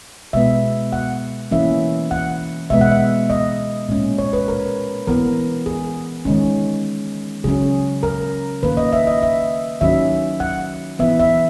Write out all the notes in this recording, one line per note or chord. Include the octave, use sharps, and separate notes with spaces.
B2 G#3 B3 E5
F#5
E3 A#3 C#4 E5
F#5
B2 G#3 B3 E5
F#5
E5
D#5
A#2 G#3 C#4
C#5
B4
A#4
E3 B3 A#4
G#4
D#3 G#3 C#4
C#3 F#3 C#4 G#4
A#4
D#3 A#3 C#4 B4
D#5
E5
D#5
E5
D#3 F#3 C#4 E5
F#5
E3 B3 E5
E5